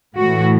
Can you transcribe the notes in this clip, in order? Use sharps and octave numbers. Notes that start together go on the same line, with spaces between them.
A2 E3 F#4